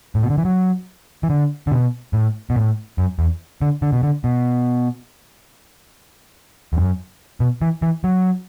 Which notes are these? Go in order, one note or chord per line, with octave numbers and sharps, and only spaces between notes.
A2
B2
D3
E3
F#3
E3
D3
D3
B2
A2
B2
A2
F#2
E2
D3
D3
B2
D3
B2
E2
F#2
B2
E3
E3
F#3